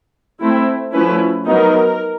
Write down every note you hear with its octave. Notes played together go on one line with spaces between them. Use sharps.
A3 C4 E4
F3 A3 C#4 E4 B4
F#3 B3 D#4 A#4